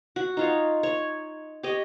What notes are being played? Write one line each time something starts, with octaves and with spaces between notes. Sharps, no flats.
F#4
D#4 F4 C#5
C#5
G4 C#5 D#5